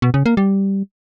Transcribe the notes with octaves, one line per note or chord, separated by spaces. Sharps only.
B2
C#3
A#3
G3